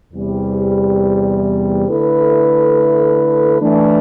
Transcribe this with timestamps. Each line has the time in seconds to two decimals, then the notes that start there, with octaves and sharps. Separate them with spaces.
0.12 E2 C3 G3
1.86 D3 A3 E4 B4
3.60 E3 A3 D4